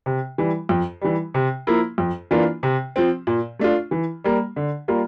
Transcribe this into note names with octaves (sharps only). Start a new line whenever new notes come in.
C3
E3 G3
F2
E3 G3
C3
F3 A#3 E4
F2
E3 A#3 D4 F4
C3
F3 C4
A#2
A3 D4 F4
E3
G3 A#3
D3
G3 A#3 F4